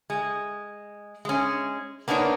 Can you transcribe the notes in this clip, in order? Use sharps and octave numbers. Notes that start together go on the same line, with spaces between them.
G#3
G#3 C#4
A#3 B3 D4 D#4 C#5